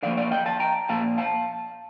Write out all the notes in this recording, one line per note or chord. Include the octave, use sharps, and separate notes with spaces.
D3 F3 A#3 D5 F5
D5 F5
D#5 G5
F5 A5
G5 A#5
A#2 F3 A#3 F5 A5
F5 A5